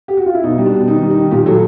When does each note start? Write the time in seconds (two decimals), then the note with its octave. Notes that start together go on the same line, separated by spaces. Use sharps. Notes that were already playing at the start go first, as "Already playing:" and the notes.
0.08 G4
0.17 F#4
0.26 F4
0.34 E4
0.43 B2 D#4
0.58 G3
0.66 D4
0.73 B2
0.88 D#3 D#4
1.02 G3
1.10 D#4
1.17 D#3
1.31 A#2 G4
1.46 F#3 A4